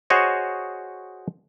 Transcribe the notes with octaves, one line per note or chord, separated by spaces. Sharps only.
F#4 G#4 C5 C#5 D#5